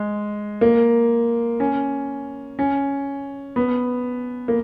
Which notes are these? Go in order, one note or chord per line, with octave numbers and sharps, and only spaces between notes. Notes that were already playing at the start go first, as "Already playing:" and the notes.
Already playing: G#3
A#3
C#4
C#4
B3
A#3